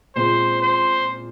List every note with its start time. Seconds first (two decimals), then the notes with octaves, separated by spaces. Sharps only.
0.16 A#2 G#3 C4 F4 C5
0.62 C5